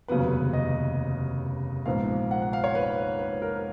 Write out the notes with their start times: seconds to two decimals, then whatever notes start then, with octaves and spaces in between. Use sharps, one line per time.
0.08 F1 D#2 C#3 F#3 B3 B4
0.53 D#5
1.86 A#1 G#2 F3 B3 F5
2.31 F#5
2.42 F#5
2.53 F5
2.64 C#5
2.75 B4
3.19 B4
3.42 A#4